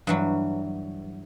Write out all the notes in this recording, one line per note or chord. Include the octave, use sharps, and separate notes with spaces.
G2 E3 F#3